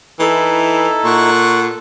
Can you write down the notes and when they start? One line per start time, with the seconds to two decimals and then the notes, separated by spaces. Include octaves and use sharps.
0.19 E3 D#4 E4 A4
1.05 A#2 F#5 C#6